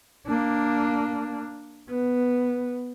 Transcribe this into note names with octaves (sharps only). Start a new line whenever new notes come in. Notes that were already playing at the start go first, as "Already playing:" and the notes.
A#3 D4
B3